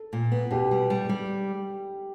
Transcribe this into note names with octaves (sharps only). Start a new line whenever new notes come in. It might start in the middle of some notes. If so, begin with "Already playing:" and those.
Already playing: A4
A#2
B3
B2 G4
G3
G3
G3